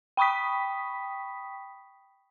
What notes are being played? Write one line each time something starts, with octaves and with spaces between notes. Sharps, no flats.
G5 B5 C#6 D#6 B6